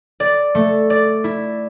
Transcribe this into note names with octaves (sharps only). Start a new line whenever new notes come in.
D5
A3
D5
E4